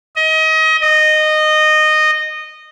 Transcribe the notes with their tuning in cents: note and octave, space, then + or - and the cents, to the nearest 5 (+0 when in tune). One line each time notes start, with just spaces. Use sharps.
D#5 +30
D#5 -15